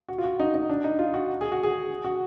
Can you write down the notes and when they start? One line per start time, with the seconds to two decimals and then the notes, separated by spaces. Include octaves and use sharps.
0.08 F#4
0.18 F4
0.24 F#4
0.39 D#4
0.54 D#4
0.69 D4
0.84 D#4
0.99 F4
1.14 F#4
1.41 G#4
1.52 F#4
1.63 G#4
2.04 F#4